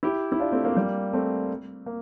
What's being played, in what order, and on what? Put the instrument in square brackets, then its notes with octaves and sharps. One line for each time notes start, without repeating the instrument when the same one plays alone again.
[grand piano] E4 G4
E4
D4 F4
A3 C4
A#3 D4
G3 A#3
A3 C4
A#3